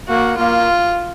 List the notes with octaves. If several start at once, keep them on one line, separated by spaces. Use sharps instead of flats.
A#3 F#4
A#3 F4